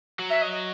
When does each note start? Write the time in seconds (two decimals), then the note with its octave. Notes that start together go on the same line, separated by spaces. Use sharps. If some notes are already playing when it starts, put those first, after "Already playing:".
0.19 F#3
0.30 E5
0.41 D#5
0.51 D#5